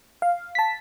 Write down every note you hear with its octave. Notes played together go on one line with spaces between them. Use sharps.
F5
A5 B6